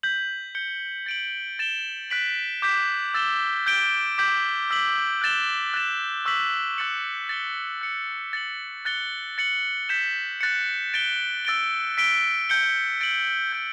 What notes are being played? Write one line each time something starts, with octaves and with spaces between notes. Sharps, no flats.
G6 B6 F#7
G6 C#7 G7
A6 D7 F#7
A6 E7 G7
F#6 B6 D7 F#7
D6 G6 B6 E7
E6 A6 E7 G7
G6 D7 G7
D6 G6 B6 F#7
E6 B6 F#7
F#6 A6 E7 G7
F#6 A6 E7
C#6 E6 B6 F#7
C#6 F#6 A6 C#7 F#7
A6 C#7 E7 G7
F#6 C#7 F#7
A6 C#7 F#7
F#6 A6 C#7 G7
A6 C#7 F#7
G6 B6 E7
F#6 A6 C#7
A6 D7 G7
E6 A6 D7 G7
E6 B6 D7 G7
G6 C#7 G7
A6 D7 F#7
G6 D7 G7